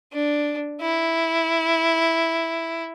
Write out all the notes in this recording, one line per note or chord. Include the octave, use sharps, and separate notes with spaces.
D4
E4